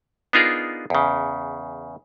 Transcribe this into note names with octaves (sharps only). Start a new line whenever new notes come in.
B3 D4 D#4 F4 G#4 A#4
E2 C#3